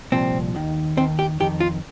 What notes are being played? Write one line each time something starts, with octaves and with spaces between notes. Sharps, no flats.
C2 A#2 F3 C4
D#2 D#3
D#2 D#3 C4
G4
F2 D#3 G4
F4